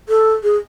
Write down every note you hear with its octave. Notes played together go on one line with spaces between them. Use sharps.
A4
G#4